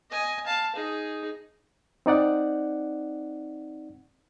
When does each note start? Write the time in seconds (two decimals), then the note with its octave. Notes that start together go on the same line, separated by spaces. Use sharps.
0.11 D#5 G#5
0.46 F5 A5
0.76 D#4 G#4
2.06 C4 D#4 D5 F#5